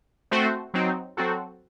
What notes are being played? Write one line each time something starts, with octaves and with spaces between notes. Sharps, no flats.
A3 C4 F#4 C5
F#3 C4 D#4
F#3 C4 F#4 A4